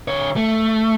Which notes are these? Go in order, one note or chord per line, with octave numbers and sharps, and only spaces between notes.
D3 C#5
A3